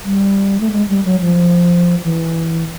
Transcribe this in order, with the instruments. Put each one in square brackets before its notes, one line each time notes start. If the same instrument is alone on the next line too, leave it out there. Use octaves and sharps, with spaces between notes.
[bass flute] G3
A3
G#3
G3
F#3
F3
E3